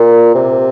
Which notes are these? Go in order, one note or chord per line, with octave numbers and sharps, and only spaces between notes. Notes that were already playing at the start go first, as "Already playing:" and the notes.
Already playing: A#2
C3